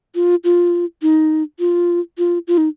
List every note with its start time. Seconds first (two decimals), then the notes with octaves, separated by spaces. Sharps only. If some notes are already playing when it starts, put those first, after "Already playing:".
0.15 F4
0.44 F4
1.02 D#4
1.59 F4
2.18 F4
2.48 F4
2.58 D#4